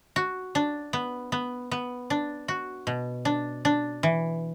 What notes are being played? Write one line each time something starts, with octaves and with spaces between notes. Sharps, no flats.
F#4
D4
B3
B3
B3
D4
F#4
B2
D4
D4
E3